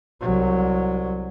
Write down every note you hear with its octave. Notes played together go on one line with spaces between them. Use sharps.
C2 F#3